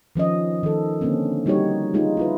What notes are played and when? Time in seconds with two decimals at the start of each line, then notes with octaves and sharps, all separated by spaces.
0.16 D#3 F3 C#4 D#5
0.63 D#3 A4
1.01 D3 A#3 C4 C#4
1.46 G3 D#4 F#4 G4 C#5
1.94 G#3 D#4 F4
2.17 E4 F4 B4